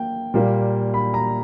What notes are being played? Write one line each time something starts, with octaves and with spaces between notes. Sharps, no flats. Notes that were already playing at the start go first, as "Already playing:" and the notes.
Already playing: A#3 G5
A#2 G3 A#3
B5
A#5